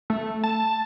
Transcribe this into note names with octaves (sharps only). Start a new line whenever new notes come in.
A3
A5